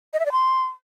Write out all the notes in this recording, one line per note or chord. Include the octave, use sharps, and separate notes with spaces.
D#5
E5
D5
C6